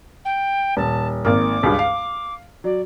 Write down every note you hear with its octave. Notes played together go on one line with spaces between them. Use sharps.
G5
D#1 A5
G#1 A#3 D6
C#2 G2
F5
F#3 D5